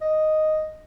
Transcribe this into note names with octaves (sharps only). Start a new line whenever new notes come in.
D#5